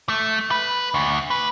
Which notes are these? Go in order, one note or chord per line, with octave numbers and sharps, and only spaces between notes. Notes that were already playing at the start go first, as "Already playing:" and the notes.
A3
B4
D2
B4